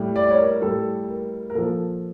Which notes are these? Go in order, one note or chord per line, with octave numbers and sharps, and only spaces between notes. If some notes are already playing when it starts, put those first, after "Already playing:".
Already playing: A2 G3
D5
C#5
A#4
A2 G3 A4
A#4
A#4
A#2 F3 A4